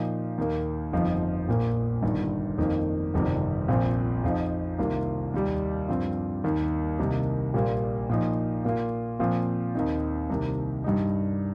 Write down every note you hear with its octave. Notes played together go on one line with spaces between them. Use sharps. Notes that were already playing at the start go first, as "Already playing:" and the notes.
Already playing: A#2 F3 D#4
D#2 D#3 A#3
G1 F2 F3 D#4
A#1 A#2 A#3
G1 G2 D#3
F2 D#3 A#3 D#4
G1 F2 C3 D#3 G3
A#1 A#2 F3 C4
F2 F3 D#4
C2 C3 D#3 A#3 F4
D#2 D#3 G3 D#4
G2 F3 C4 F4
D#2 D#3 A#3
C2 C3 D#3 A#3 D#4
A#1 A#2 G3 A#3 F4
A#2 F3 D#4
A#2 A#3 F4
A#2 F3 C4 F4
D#2 D#3 C4 D#4
C2 C3 D#3 A#3
G2 G3 D#4